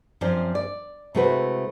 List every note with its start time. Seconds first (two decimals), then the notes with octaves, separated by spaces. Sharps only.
0.21 F#2 F3 C4 C5 D5
0.55 D5
1.15 C3 G#3 A3 E4 F#4 B4